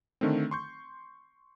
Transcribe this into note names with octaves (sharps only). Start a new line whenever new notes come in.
D3 D#3 A3 C4
C6 C#6 G6